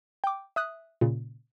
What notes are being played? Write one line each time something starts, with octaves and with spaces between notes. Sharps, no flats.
G5 D6
E5 D#6 F#6
A#2 C#3